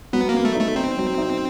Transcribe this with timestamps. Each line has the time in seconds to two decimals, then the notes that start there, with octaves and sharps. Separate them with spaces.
0.13 F#3 B3
0.29 A#3
0.34 B3
0.45 A3
0.55 D#4
0.60 A3
0.76 C4 D#4
0.97 F#3
1.18 D#4